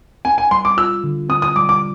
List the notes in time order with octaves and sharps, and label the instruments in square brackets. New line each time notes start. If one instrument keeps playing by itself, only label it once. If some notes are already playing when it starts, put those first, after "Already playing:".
[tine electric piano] C4 [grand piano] G#5
[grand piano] G#5
[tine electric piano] G3 [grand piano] C6
[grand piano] D6
[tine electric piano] F4 [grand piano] E6
[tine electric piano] D3
[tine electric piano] C4 [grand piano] D#6
[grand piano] D#6
[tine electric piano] G3 [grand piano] D6
[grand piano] D6